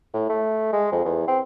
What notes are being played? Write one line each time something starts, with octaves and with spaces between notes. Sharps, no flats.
A2
A3
G#3
F2
E2
C4